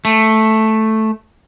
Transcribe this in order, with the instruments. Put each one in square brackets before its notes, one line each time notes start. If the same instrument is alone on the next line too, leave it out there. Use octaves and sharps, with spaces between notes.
[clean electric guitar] A3